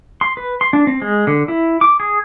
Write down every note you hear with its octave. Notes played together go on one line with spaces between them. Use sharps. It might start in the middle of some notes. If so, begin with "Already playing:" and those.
C6
B4
C6
D4
C4
G#3
D3
E4
D6
G#4